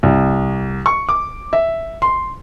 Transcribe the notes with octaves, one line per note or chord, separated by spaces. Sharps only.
C2
C#6
D6
E5
C6